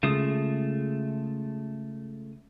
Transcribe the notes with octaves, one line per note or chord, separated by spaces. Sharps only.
C#3 G#3 A3 F4 D#6